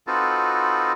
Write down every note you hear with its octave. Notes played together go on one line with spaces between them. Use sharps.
C4 D#4 F4 F#4 A4 B4